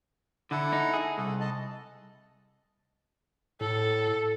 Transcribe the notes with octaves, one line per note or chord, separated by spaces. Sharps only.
D3 E4 A4 F#5
D#4
G#4
C2 A4
D#5 A5
A2 A4